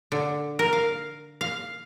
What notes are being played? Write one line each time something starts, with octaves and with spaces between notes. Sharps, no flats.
D3
A#4
F5
F5